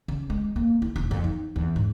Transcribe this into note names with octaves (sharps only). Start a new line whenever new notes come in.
C#3
G#3
A#3
E4
E1
F2
D#4
E2
G#2